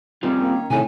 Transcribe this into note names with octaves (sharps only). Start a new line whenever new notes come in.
D#3 G3 C4 C#4 F4
A#3
A2 C3 D#3 G#5